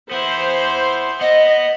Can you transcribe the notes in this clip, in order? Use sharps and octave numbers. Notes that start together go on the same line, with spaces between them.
B3 E4 C5
B3 D#5